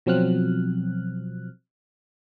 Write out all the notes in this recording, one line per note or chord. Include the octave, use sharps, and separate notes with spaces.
B2 F3 F#3 C4 F6 F#6